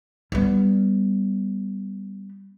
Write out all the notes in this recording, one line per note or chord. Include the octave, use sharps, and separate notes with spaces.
G3 B3